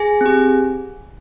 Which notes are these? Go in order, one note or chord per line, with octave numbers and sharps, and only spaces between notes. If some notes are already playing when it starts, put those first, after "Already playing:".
Already playing: G#4 G#5
C4 G4